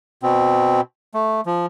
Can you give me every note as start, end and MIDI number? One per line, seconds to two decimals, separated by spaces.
0.23 0.81 47
0.23 0.81 60
1.14 1.41 57
1.46 1.66 53